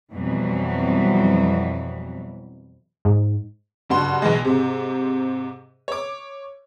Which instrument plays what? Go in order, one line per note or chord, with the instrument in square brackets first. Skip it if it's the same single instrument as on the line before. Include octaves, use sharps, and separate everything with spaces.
[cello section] F2 B2 E3 F#3 G3
[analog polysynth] G#2
[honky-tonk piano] F#1 G2 F#4 C6
B1 E3 G#3
G#2 C3
C#5 D6